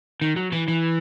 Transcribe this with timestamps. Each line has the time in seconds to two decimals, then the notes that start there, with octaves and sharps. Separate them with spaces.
0.21 D#3
0.36 F#3
0.52 E3
0.68 E3